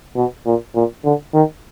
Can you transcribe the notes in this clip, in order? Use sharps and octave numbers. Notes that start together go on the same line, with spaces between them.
B2
A#2
A#2
D3
D#3